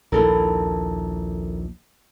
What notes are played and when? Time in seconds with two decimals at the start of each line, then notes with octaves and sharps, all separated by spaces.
0.12 A#1 D#2 E4 A4 A#4